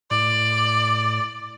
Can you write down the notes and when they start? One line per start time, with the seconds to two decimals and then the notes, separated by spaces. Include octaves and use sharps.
0.11 A2 D5